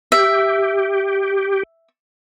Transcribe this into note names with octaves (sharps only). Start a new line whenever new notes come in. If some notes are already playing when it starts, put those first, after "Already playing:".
G4 E5